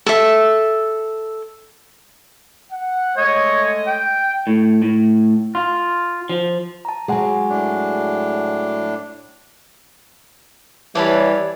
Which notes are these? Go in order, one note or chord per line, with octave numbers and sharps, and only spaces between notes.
A4 E5
F#5
G#3 A3 C#5 D#5
G5
A2
A2
F4
F3
A5 A#5
F#3 G#3 G#4 F#5 G#5
A2 D4
E3 G3 C#5 D5 A5 B5